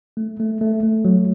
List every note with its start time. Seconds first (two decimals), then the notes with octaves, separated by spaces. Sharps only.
0.17 A3
0.40 A3
0.61 A3
0.83 A3
1.05 F#3